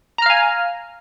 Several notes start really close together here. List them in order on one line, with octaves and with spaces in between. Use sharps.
A#5 F6 F5 G#5